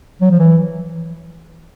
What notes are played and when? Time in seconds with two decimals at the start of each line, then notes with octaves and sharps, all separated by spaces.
0.22 F#3
0.31 F3
0.39 E3